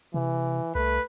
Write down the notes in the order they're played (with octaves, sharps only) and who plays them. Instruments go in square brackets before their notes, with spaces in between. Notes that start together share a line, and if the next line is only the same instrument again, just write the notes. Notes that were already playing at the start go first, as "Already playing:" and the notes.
[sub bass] C3 [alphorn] E3
[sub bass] C2 [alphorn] A3 [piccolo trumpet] B4